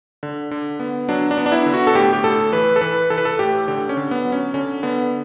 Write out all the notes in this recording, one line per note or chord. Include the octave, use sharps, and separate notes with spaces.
D3
D3
B3
F#3 D4
D4
B3
D4
E4
D3
F#4
A4
A2 G4
G4
A2 A4
E3 B4
A4
E3 B4
E3 A4
B4
A4
A2 G4
D3 G4
C#4
D3
B3
F#3
C#4
D3 C#4
D3 B3